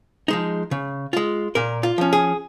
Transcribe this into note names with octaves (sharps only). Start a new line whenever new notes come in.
F3 G#3 D#4
C#3
G#3 F4
A#2 A#4
F4
F3 C#4
G#4